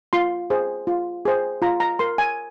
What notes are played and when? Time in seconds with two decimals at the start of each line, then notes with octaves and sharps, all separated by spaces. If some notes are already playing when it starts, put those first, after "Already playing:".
0.13 F4 C6
0.50 G#4 C5
0.87 F4
1.25 G#4 C5
1.62 F4 A#5
1.80 A#5
1.99 A#4 C6
2.18 G#5